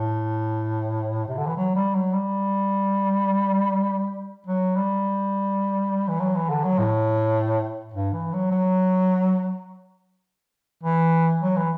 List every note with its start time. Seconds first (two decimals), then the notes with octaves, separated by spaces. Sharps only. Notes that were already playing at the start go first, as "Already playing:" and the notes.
Already playing: A2
1.28 C3
1.37 D3
1.47 E3
1.57 F#3
1.75 G3
1.95 F#3
2.14 G3
4.47 F#3
4.76 G3
6.08 E3
6.20 F#3
6.35 E3
6.50 D3
6.64 F#3
6.78 A2
7.94 G2
8.13 E3
8.33 F#3
8.51 F#3
10.83 E3
11.42 F#3
11.56 E3